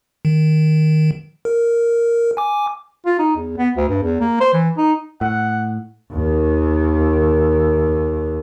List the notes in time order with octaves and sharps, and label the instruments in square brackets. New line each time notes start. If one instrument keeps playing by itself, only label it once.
[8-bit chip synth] D#3
A#4
G#5 D6
[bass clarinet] F4
D#4
E2
B3
D2
G2
E2
A#3
C5
E3
D#4
[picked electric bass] A2 [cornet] F#5
[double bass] D#2 D#3